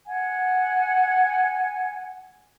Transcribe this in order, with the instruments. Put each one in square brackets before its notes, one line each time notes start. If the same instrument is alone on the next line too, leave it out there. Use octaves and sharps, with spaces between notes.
[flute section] F#5 G#5